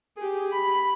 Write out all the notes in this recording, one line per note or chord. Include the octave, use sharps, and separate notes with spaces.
G4 G#4
B5